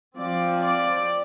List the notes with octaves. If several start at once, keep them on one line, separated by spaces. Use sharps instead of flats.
F3 C4 D5
D5